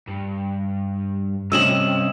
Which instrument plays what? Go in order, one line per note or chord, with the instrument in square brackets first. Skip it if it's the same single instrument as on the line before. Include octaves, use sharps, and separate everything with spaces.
[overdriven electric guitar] G2
[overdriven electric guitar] G2 [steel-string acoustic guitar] C3 C#4 D#5 [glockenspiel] E6 E7 F#7